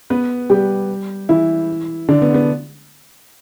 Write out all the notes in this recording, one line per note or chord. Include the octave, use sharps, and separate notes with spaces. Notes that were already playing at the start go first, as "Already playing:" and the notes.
B3 B4
G3 G4
E3 E4
D3 D4
B3
B3